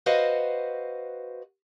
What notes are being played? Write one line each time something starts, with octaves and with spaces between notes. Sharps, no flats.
F#4 B4 C5 D#5 F5 F#5